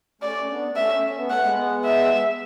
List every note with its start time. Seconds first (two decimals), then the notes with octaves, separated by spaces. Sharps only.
0.21 A3 C#4 D5
0.49 B3 D4
0.76 A3 C#4 E5
1.04 C#4
1.16 B3
1.28 A3 F#5
1.41 G#3 B3
1.85 E5